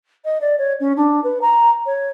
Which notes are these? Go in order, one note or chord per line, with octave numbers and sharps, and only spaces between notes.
D#5
D5
C#5
C#4
D4
B4
A#5
C#5